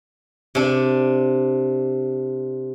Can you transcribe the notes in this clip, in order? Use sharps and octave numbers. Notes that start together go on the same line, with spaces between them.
C3 D4